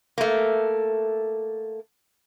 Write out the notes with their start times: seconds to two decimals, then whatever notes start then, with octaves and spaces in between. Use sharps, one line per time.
0.18 A3 A#3